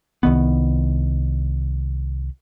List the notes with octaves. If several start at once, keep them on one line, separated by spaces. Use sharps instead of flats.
C2 D#3 B3